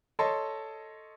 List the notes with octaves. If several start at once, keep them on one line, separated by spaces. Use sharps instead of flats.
A4 C#5 D#5 A5 C6